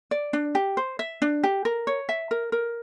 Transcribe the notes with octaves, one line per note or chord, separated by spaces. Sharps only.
D5
D4
G4
C5
E5
D4
G4
A#4
C#5
E5
A#4
A#4